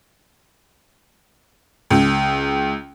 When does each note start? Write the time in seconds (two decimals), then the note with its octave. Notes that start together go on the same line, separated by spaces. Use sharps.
1.90 C#2